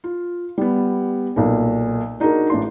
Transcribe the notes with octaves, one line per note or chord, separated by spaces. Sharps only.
F4
G3 B3
B1 A#2
D4 D#4 F#4 G#4 A#4
A1 D4 C6